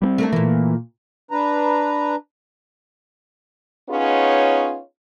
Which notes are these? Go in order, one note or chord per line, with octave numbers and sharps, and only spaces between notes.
G3 B3 C4
A3 A#3 D4
A#2 E3 A#3
D4 B4 A#5
B3 C#4 D#4 F4 G#4 C#5